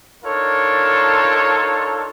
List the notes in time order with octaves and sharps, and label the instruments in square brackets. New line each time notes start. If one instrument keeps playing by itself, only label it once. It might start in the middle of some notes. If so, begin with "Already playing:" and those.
[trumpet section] D4 D#4 F4 A4 A#4 C#5